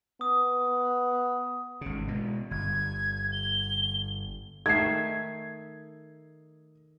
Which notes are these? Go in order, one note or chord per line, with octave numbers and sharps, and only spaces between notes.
B3 D#6
G#1 C#3
B2 G#3
G1 G#6
G7
D#3 A3 E5 G#6 C7